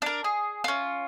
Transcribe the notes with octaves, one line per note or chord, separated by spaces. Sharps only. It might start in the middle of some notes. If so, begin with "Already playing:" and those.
D4 A#4
G#4
C#4 F4